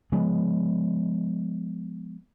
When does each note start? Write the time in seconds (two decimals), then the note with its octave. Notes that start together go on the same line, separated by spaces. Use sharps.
0.12 F3 G#3 B3